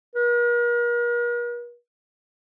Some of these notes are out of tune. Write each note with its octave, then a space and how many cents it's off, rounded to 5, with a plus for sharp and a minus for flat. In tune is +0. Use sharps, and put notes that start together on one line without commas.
A#4 +45